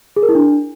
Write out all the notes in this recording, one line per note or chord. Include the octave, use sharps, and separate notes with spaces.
G#4
A#4
E4
D4